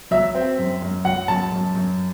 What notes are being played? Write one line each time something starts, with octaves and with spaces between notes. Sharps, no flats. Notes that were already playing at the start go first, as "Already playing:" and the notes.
F#3 E5
C4
F#2
F#2
F#3 F#5
F#2 A5
F#2
F#2